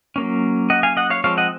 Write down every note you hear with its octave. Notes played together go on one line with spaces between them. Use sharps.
F#3 A#3 C#4
D#5 F#5
F5 G#5
D#5 F#5
C#5 F5
F3 G#3 C4 C#5 F5
D#5 F#5